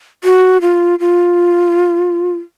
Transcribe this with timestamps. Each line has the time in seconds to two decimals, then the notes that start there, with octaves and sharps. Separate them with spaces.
0.24 F#4
0.62 F4
1.00 F4